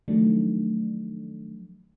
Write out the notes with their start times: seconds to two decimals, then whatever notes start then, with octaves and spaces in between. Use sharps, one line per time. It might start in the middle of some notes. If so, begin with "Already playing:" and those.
0.08 D#3 F3 F#3 A3 D4